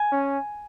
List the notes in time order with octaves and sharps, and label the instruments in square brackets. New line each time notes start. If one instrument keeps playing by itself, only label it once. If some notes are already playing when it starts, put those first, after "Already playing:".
Already playing: [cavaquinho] G#5
[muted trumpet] C#4